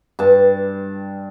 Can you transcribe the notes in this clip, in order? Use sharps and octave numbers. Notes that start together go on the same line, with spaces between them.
G2 A5